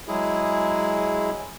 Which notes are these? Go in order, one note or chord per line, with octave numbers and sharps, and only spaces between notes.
F#3 G#3 E4 G#4